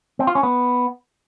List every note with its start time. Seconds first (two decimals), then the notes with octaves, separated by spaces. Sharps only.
0.19 C4
0.27 F4
0.35 C#4
0.43 B3